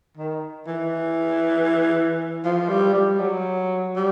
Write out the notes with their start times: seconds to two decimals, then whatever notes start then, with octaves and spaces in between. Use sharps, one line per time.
0.17 D#3
0.67 E3
2.45 F3
2.69 G3
2.94 G3
3.20 F#3
3.96 G3